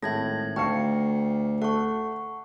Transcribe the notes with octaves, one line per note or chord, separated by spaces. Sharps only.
G#1 A2 E5 G#6 A#6
D2 F5 G5 A5 C#6 C#7
A3 F#5 C#6